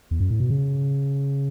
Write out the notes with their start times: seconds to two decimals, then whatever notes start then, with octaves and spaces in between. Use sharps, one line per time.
0.11 E2
0.20 F#2
0.31 A2
0.40 B2
0.50 C#3